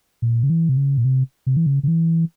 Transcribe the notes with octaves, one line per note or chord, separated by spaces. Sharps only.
A#2
C#3
E3
C3
C#3
A#2
C3
C3
E3
C#3
C#3
E3